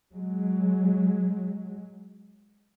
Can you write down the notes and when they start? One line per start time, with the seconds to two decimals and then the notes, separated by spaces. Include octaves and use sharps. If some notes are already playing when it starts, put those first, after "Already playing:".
0.12 F#3 G#3